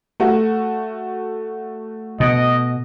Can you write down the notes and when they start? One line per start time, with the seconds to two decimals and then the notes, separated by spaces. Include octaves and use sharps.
0.20 A3 F#4
2.20 B2 D#5